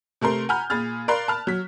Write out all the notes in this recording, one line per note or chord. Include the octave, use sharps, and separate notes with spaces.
C3 A3 A#4 C6
F#5 G#5 A#5 B5 F6 G6
A#2 G#4 B5 F6 A6
A#4 D5 F5 B5 C6 F#6
A5 B5 F6
F#3 B6